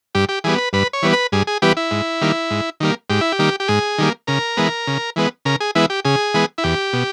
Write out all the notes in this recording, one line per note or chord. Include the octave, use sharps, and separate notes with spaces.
G2 G4
G4
E3 G3 B3 G#4
B4
G2 B4
C#5
E3 G3 B3
B4
G2 G#4
G#4
E3 G3 B3 G4
E4
G#2
D#3 G3 A#3
G#2
D#3 G3 A#3
G#2 G4
E4
G4
D#3 G3 A#3
G4
G#2 G#4
D#3 G3 A#3
C#3 A#4
E3 G#3 B3
C#3
E3 G#3 B3
C#3 A#4
G#4
E3 G#3 B3 E4
G4
C#3 G#4
E3 G#3 B3
E4
E2 G4
B2